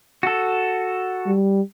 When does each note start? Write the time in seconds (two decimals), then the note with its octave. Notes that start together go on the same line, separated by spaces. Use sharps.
0.23 F#4 A4
1.26 G3